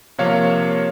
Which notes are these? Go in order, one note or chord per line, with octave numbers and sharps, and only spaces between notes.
C3 F3 A#3 C#5 F5